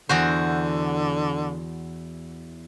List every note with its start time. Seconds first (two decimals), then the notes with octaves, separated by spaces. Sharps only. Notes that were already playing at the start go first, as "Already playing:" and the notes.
0.09 E2 D3 F#4 C5